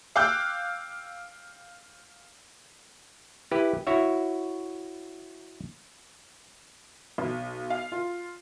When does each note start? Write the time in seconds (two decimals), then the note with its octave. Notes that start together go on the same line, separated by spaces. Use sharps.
0.16 F5 G5 D6 E6 F#6 G6
3.51 E4 G4 B4
3.87 E4 F#4 C#5 E5
7.18 B1
7.70 F5
7.92 F4